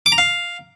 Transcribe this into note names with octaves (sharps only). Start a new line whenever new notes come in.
D6
A#5
F5